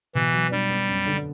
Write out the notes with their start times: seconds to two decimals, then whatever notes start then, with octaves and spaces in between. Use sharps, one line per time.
0.15 B2 E3
0.33 F#3
0.51 G3 D4
0.70 B3
0.88 F#2
1.06 D3